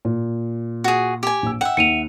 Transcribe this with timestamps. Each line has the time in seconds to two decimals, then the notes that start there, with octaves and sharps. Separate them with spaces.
0.05 A#2
0.84 F#4 G#4
1.23 G4 G#5
1.42 A#1 E6
1.61 E5 F#5 G5
1.77 D#2 C#7 D#7 F7